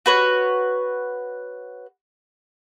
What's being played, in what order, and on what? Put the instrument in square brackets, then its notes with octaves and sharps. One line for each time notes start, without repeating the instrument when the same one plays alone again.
[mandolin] F#4 B4 C#5